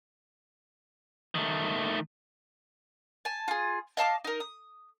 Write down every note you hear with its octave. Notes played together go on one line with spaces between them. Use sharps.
D#3 A3
G#5 A5
F4 G#4
D#5 F5 A5 D6
D#4 A#4
D#6